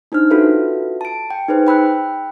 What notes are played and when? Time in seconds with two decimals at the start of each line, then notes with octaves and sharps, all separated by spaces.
0.12 D4 D#4 C5 F6
0.30 F4 F#4 A4 B4 E5
1.01 A5 D7
1.30 G5
1.48 D#4 G#4 B4 C5
1.67 G5 B5 E6 F#6